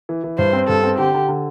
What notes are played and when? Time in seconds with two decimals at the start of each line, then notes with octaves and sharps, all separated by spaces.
0.09 E3
0.24 E3
0.38 G2 C5
0.53 C4
0.68 G2 A4
0.84 C4
0.98 D3 G4
1.14 D3
1.29 D3